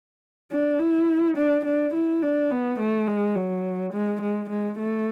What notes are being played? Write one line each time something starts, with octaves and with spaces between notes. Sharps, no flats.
D4
E4
D4
D4
E4
D4
B3
A3
G#3
F#3
G#3
G#3
G#3
A3